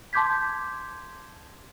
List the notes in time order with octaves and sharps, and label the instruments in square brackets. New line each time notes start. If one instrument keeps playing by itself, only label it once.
[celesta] A5 C6 D6 G6 G#6 B6